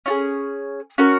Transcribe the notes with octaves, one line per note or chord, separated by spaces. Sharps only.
C#4 F4 G#4
C#4 F#4 A#4